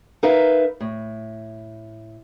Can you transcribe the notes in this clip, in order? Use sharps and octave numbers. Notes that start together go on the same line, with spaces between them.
D#4 A#4 B4 E5 F5
A2